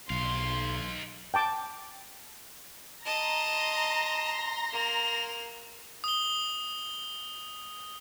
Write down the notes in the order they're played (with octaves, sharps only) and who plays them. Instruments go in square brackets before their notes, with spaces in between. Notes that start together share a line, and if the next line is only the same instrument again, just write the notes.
[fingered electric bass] B1 [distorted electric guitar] D#4 F5 [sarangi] C6
[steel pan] G5 A5 D6
[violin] D#5 A5 [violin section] A#5 C6 A#6
[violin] A#3 F7
[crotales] D#6 G7